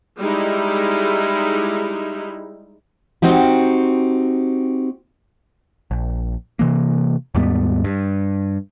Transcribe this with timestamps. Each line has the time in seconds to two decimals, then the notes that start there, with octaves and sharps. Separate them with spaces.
0.18 G3 G#3 D#4 E4
3.22 C4 D#4 F#4 G4
5.91 A#1
6.59 C3 E3 A#3
7.35 D#2 G#2 G3 B3
7.84 G2